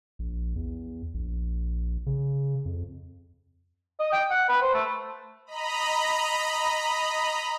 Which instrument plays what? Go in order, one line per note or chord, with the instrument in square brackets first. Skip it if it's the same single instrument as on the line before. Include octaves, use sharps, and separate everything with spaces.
[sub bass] A#1
E2
A#1
C#3
F2
[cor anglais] D#5
G5
F#5
B4
C5
A3
[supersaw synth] D#5 A#5 B5